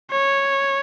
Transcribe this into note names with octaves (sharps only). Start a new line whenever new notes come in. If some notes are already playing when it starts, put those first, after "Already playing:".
C#5